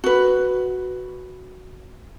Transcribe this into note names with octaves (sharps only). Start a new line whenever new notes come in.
F#4 B4